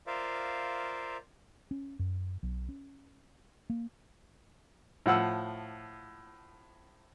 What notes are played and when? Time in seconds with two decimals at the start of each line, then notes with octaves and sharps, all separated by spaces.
0.07 F4 A#4 C5 D5 E5 F5
1.71 C#4
1.99 F#2
2.43 B1
2.69 C#4
3.70 A#3
5.06 A2 F3 F#5 E6